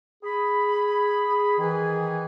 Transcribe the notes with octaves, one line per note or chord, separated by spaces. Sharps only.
G#4 B5
D#3 E3 G#4